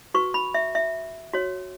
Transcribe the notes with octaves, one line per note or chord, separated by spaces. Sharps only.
F#4 B4 C#6
B5
E5
E5
F#4 C#5